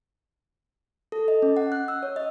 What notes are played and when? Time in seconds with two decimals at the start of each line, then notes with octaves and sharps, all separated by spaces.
1.12 A4
1.28 D#5
1.42 C#4
1.57 F#5
1.72 F#6
1.88 E6
2.03 C#5
2.16 D#5